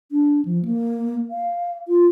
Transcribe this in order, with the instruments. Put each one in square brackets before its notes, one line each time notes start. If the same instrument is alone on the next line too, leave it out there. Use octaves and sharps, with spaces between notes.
[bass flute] D4
F3
A#3
F5
F4